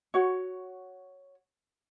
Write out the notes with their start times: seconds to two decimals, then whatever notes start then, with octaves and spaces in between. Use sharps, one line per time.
0.14 F#4 C#5